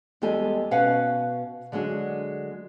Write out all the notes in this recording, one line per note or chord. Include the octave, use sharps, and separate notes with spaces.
E2 G3 G#3 G4 A4 G#5
B2 C#4 B4 F5 F#5
D3 F#3 G#3 D4